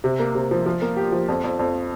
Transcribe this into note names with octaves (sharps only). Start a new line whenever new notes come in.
C3
A#3
C3
F3
F3
A#3
G4
F3
F2
F2
F2